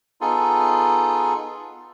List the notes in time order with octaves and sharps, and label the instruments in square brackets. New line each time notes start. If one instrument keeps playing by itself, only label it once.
[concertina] B3 D#4 F4 G#4 A4